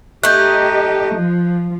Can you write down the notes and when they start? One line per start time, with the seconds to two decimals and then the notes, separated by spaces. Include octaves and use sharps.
0.23 A3 D#4 G4 D#5 F#6 G6
1.14 F3